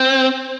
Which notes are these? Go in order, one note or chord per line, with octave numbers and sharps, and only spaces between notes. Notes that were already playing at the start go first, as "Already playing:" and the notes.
Already playing: C4